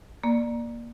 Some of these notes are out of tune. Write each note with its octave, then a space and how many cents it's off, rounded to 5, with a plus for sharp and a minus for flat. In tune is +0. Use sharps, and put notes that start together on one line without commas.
A#3 +15 D5 +15